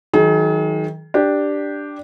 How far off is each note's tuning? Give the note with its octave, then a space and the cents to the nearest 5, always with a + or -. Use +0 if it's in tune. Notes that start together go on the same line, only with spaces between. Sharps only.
D#3 +30 F#3 +0 G#4 +40
D4 +0 G4 +0